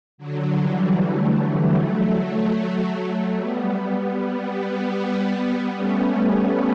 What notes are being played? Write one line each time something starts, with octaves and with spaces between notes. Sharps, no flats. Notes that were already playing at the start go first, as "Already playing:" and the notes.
D3 F#3
E3 G3
F#3 A3
G3 B3
A3 C#4